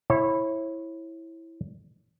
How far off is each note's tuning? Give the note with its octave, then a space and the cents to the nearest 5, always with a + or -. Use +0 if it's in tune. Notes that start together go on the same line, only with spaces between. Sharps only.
E4 +0 C#5 -35